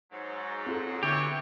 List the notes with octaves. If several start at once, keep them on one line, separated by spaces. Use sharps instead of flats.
G#2 F#3
C4 F4 A4
B2 D3 E3 G4 C#5